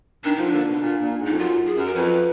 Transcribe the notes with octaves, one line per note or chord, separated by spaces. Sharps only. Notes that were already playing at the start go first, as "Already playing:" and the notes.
B2 D#3 D4
D3 F3 D#4
D4
A#2 D3
B2
A#2
A#2
G#2
F2 D#4
F#2 F4
G#4
F#2
A#4
F2 B4